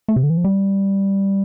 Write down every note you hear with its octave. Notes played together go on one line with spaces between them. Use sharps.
A3
C3
D3
E3
F3
G3